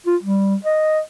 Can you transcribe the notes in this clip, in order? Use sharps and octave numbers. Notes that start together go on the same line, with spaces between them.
F4
G3
D#5